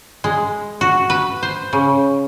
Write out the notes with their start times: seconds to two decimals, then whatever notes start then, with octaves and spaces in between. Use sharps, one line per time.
0.24 G#3
0.81 F#4
1.10 B4
1.43 C5
1.73 C#3